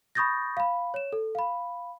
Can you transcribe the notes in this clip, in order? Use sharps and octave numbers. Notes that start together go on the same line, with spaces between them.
B5 C#6 D#6 G6 A6 A#6
F5 B5
C#5 E7
A4
F5 B5